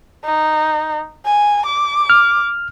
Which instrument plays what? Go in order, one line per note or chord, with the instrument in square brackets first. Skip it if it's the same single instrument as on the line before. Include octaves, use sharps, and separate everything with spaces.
[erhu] D#4
G#5
D6
[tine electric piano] F6